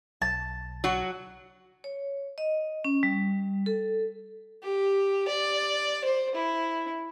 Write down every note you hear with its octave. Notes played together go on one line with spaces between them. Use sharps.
B1 A5
F#3 F#4
C#5
D#5
C#4
G3
A4
G4
D5
C5
E4